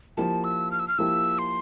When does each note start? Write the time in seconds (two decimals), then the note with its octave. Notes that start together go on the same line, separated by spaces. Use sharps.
0.17 F3 A#3 E4 G4 A5
0.44 E6
0.71 F6
0.80 E6
0.88 F6
0.98 F3 A#3 E4 G4 E6
1.39 C6